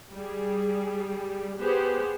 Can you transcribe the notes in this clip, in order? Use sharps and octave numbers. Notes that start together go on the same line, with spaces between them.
G3 G#4
B3 G4 G#4 C5